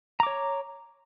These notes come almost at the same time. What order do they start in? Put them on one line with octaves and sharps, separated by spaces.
A#5 D6 C#5